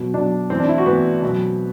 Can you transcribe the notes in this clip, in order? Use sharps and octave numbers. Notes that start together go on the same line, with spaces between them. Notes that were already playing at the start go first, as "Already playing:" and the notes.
Already playing: B2 F#3
B2 F#3 D4
A2 E3 C4
D4
E4
F#4
A2 E3 B3
B2 F#3